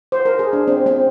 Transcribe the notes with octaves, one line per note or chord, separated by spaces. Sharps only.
C5
A#4
G#4
D4
C4
C4